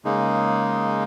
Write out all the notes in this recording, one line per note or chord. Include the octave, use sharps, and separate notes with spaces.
C#3 G#3 A#3 D#4